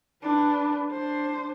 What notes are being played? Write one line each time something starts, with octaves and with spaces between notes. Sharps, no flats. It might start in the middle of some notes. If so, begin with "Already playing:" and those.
D4 B4
D4 C5